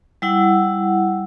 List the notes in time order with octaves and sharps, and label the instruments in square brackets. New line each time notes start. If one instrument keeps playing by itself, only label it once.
[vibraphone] G3 E4 F#5